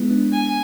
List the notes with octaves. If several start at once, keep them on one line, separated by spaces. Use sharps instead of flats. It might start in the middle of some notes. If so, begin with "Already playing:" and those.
Already playing: G#3 B3 E4
B3 D4
G#5